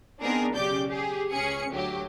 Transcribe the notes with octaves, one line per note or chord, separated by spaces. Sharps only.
B3 C4 D4 D#4 G#4 A#4
B1 C#3 G4 D5 D6 G6
G4 G#4
C#2 C#4 G#4 C#7
D2 F#3 G4